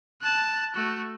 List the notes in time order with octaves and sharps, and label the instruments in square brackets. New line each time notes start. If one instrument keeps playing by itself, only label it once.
[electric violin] A5 F#6
A3 F#4